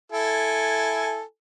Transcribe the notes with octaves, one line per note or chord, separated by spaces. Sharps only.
E4 A4 G#5